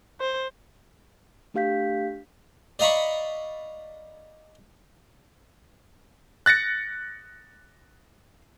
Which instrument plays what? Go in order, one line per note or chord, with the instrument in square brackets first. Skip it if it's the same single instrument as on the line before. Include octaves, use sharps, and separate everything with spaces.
[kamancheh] C5
[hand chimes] A3 D4 G4 F5 G6 B6
[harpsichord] D5 D#5 F5 A#5 B5 C#6
[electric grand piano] F#6 A6 A#6 C#7